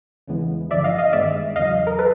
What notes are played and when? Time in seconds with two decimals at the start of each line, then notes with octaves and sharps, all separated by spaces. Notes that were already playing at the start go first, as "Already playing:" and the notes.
0.27 E2 C#3 E3 G#3 B3
0.70 G1 G2 D3 F3 D5 E5
0.84 D#5 F5
0.98 D#5 F5
1.13 G2 D#3 G#3 B3 D5 E5
1.56 E2 C#3 F#3 D#5 F5
1.87 A#4
1.99 A4 B4